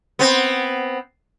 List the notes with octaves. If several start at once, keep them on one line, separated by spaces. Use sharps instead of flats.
B3 C4